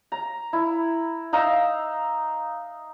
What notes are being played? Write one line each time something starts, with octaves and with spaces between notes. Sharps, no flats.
A#5
E4
D#4 F5 A#5 E6